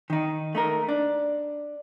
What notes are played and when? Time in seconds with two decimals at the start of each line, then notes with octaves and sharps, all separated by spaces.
0.10 D#3 D#4
0.55 A3 D#4 A#4
0.89 D4